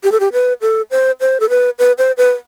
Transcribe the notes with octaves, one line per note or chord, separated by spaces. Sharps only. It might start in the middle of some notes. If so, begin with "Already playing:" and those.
G4
A4
G4
B4
A4
C5
C5
A4
B4
B4
C5
B4